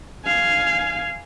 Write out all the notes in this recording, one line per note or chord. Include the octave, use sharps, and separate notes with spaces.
F5 G#5